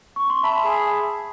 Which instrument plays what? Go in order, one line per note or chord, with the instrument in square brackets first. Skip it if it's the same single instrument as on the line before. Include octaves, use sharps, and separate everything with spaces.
[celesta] C#6
C6
[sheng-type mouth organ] E5 [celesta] A5 B5
[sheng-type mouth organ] G#4